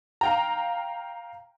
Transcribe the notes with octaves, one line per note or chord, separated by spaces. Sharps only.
F5 G5 A#5